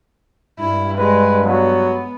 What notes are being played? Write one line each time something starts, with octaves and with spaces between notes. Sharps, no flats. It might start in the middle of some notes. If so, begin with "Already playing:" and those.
G2 E4
G#3 B4
F#3 B3